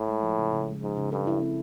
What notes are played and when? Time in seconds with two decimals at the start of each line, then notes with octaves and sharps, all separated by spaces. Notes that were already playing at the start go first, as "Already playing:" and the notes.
Already playing: A2
0.08 G#3
0.23 F3
0.38 C#3
0.53 C#3
0.67 G#3
0.82 G#2 F3
0.97 C#3
1.12 G2 A4
1.27 E4
1.42 C4